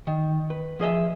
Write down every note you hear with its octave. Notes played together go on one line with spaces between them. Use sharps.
D#3
B4
F3 G#4 D#5 E5